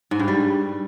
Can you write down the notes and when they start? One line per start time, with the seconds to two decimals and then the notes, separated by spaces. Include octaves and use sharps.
0.11 G#2
0.20 G2
0.28 G3